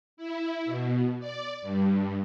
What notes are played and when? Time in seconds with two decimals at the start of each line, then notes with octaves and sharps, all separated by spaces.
0.17 E4
0.65 B2
1.20 D5
1.62 G2